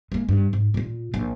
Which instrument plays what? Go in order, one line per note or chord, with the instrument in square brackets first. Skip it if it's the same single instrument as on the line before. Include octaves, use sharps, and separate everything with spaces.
[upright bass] G#3 A#3
G2
G#2
A#2 F4
A#1